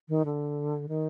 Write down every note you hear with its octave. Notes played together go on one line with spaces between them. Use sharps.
D#3
D3
D#3